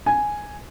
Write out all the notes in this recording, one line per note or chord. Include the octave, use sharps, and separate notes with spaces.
G#5